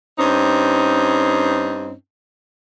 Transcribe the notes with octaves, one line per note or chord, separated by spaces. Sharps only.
G2 C4 C#4 D#4